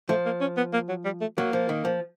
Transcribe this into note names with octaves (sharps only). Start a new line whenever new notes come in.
F3 A3
A#3
C#4
B3
A#3
F#3
G3
A3
F#3 A#3
F3
D#3
F3